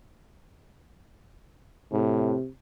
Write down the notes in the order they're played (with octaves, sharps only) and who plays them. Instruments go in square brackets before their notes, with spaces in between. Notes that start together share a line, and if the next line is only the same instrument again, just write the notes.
[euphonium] A2 [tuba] C3